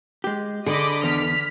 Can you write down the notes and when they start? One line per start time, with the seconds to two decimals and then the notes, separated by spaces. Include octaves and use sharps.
0.24 G#3 G4
0.66 D3 G#4 D#5 B5 D6
1.03 E2 F6 B6